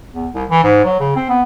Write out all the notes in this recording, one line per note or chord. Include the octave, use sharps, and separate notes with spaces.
E2
C2
E3
G#2
F#3
C#3
C4
B3